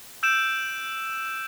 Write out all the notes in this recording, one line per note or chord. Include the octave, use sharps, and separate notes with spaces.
E6 G6 D7 E7